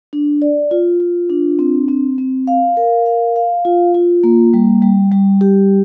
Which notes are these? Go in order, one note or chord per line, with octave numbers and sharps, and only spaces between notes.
D4
D5
F4
F4
D4
C4
C4
C4
F5
A#4
F5
F5
F4
F4
A#3
G3
G3
G3
G4